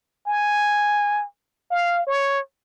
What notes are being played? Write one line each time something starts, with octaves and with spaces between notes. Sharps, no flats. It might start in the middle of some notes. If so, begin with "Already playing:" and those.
G#5
F5
C#5